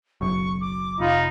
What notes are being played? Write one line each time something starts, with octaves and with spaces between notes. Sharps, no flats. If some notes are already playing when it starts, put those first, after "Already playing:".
F#1 B1 F#2 C#6
D6
F1 D#4 F4 B5